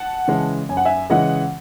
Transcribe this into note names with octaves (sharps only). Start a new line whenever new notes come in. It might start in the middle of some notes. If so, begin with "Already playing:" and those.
Already playing: F#5 A5
C#3 E3 G#3
F#2 G#5
F#5
E5 G#5
C#3 E3 G#3 D#5 F#5